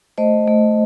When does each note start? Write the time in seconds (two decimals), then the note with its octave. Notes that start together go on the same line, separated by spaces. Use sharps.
0.18 A3 C5 D#5
0.47 A3